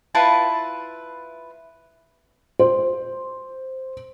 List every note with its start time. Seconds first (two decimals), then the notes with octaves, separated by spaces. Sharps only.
0.15 E4 F4 B4 A5
2.59 C5